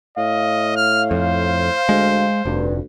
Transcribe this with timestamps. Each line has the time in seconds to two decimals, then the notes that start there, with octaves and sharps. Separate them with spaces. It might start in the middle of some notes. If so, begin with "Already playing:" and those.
0.17 A2 D#5 F5
0.76 F6
1.11 F2 C5
1.89 D2 G#3
2.45 F1 D2 G2